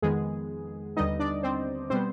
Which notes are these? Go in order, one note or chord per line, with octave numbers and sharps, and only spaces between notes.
F2 D#3 G#3 B3 G#4
D#2 D3 G3 B3 D#4 D#5
D4 D5
C4 C5
B2 G3 B3 C4 C5